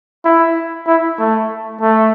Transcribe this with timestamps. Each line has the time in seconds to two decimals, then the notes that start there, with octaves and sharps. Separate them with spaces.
0.24 E4
0.87 E4
1.18 A3
1.81 A3